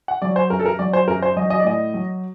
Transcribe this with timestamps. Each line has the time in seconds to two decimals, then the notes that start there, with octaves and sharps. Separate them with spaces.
0.08 F#5
0.22 F#3 D5
0.36 C5
0.50 F#2 A#4
0.59 A4
0.66 A#4
0.79 F#3 D5
0.93 C5
1.08 F#2 A#4
1.22 C5
1.37 F#3 D#5
1.50 D#5
1.59 D5
1.65 A2 D#5
1.94 F#3